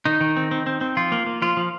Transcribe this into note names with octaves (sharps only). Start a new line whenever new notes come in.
D#3 D#4
D#3
C4
C4
C4
C4
F3 F4
A#3
A#3
F3 F4
F3